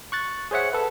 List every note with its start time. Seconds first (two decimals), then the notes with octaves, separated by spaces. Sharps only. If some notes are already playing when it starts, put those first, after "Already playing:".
0.12 C#6 F#6 A6
0.51 G#4 C5 C#5 E5 F#5
0.73 A4 B4